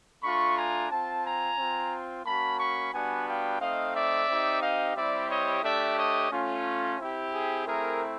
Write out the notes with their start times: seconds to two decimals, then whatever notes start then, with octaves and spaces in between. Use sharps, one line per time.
0.23 A3 D4 F4 B5 C#6
0.57 G#5 A#5
0.91 C4 F4 G5 A5
1.24 G#5 A#5
1.58 C4 F4
2.25 A#3 C#4 F#4 A5 B5
2.59 B5 C#6
2.93 G3 B3 D4 F#4 F#5 G#5
3.27 F5 G5
3.60 A3 C4 D#4 D#5 F5
3.94 D5 E5
4.29 C4 D#4 G4
4.62 D#5 F5
4.96 G3 C4 E4 G4 D5 E5
5.30 C#5 D#5
5.63 A3 D4 G4 D5 E5
5.97 C#5 D#5
6.31 A3 C#4 F4
6.99 C4 E4 G4
7.33 G#4
7.66 A3 C4 E4 G#4 A#4